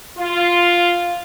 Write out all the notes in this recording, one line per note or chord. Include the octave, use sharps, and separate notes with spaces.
F4